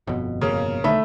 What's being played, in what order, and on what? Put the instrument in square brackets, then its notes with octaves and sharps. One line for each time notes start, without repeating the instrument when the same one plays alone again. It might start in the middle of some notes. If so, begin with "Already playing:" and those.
[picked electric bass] G1 F2 B2
[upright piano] C#3 A#3 C#4
[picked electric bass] B1 D3 D#3 [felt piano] A3 E5 B5